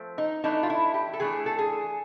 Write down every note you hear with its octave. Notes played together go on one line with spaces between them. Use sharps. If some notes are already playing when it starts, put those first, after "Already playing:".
Already playing: F3 A3 C4
D#4
E3 A3 D4 D#4
F4
E4
G4
A4
E3 A3 D4 G#4
A4
G#4